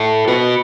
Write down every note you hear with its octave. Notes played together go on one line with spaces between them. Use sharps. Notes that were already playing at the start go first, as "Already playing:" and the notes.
Already playing: E4 A4
F#4 B4